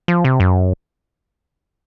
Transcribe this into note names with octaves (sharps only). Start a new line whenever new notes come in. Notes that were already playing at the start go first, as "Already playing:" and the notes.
F3
C3
F#2